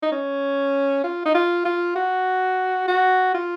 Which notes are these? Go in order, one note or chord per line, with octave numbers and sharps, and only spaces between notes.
D#4
C#4
F4
D#4
F4
F4
F#4
F#4
F4